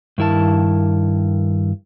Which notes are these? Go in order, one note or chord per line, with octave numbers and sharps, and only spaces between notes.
G2 D#3 E4 A#4 A5